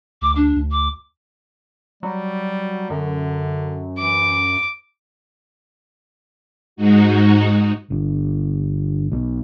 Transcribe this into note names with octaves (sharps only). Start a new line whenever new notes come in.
D2 D6
D4
D2
D6
F#3 G3
F#2 D3
E3 D6
G#2 G#3 D#4 F#4
G1
B1